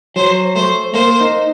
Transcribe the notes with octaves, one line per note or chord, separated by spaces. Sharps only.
F#3 C5
A3 C5
A#3 C5
D#4